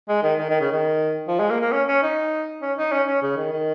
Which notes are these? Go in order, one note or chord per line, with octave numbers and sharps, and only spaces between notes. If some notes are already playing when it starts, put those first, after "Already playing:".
G#3
D#3
D#3
D#3
C#3
D#3
F3
G#3
A#3
A#3
C#4
C#4
D#4
C#4
D#4
C#4
C#4
C#3
D#3
D#3